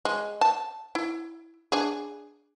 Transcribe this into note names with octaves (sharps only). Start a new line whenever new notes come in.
G#3
A5
E4
D4 G#4